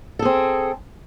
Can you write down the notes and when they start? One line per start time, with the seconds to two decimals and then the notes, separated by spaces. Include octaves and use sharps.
0.19 A4
0.22 G#4
0.25 C4